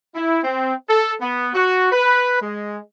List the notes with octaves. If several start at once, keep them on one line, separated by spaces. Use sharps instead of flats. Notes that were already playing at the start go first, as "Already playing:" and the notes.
E4
C4
A4
B3
F#4
B4
G#3